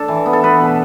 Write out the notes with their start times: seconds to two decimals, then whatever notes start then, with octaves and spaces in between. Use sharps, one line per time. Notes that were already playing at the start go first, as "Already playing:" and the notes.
Already playing: D4 A4
0.08 E3
0.26 B3
0.33 A4
0.44 B3 B4
0.61 B2